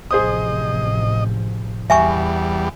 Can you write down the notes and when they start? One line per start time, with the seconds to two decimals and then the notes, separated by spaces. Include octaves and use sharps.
0.11 A1 C3 F3 G#4 C5 D#5 D#6
1.90 E2 G3 E5 G#5 C#6